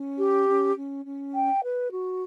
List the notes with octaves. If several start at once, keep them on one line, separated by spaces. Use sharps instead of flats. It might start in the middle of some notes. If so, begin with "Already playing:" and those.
Already playing: C#4
G4
C#4
C#4
C#4
G5
B4
F#4